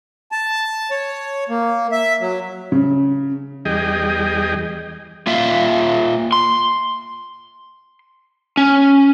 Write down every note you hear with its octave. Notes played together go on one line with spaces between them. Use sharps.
A5
C#5
A#3
E5
F#3
C#3
E2 G3 G#4 D#5 G5
A#3 F4 E5 F5
C6
C#4